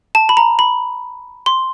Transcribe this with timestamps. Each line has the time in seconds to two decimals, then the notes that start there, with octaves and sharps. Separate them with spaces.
0.15 A5
0.29 B5
0.37 A#5
0.59 B5
1.46 C6